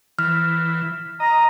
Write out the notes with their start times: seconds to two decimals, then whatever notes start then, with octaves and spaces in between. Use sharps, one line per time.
0.19 E3 F6
1.20 D#5 A#5